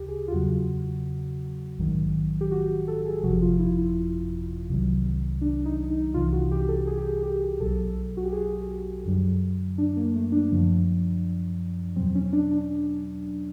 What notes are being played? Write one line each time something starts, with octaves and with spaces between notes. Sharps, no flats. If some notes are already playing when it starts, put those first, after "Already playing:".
Already playing: D2 C#3 G4
G#4
F4
E2 C#3 F#3 F#4
A#1 G#2 D#3 F#3
G4
F#4
A4
G#4
G1 F2 C3 F3 F#4
F4
E4
E4
C2 C3 D#3 F#3
D4
D#4
D#4
C2 C3 E3 F4
F#4
G4
A4
G#4
G4
G#4
G4
B1 B2 F#3 A4
F#4
G4
G#4
F#2 D3 F#3
D4
A#3
A3
D4
F#2 D3 F3
E2 B2 F#3 C4
C#4
D4
D4